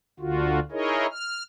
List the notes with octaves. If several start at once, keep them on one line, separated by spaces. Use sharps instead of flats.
D2 D3 F4 F#4
D#4 E4 G#4 A#4 C#5 D#5
F6